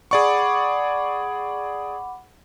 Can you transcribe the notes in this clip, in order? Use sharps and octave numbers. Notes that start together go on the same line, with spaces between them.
G#4 D5 F#5 B5 C#6 D6